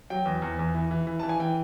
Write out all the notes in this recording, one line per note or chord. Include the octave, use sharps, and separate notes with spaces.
F#3 G5
E2
E2
E2
E3
E3
E3
E3 A5
G#5
E3 G5